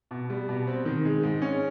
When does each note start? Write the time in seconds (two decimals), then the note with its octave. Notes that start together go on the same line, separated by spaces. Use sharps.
0.11 B2
0.30 G3
0.49 B2
0.67 C4
0.85 D#3
1.05 G#3
1.23 G#2
1.42 C#4